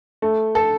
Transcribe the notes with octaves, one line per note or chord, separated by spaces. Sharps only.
A3
A4